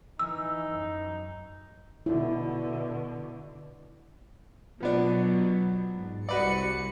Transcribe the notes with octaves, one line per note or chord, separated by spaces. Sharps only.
E3 D#4 E6
F#2
B2 D3 E4
B2 F3 F#3 B3 D4
G#2
C2 F#4 B4 D5 C#7